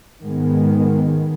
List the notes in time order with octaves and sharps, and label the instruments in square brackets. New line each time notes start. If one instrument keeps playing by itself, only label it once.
[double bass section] G#2 D#3 G#3 B3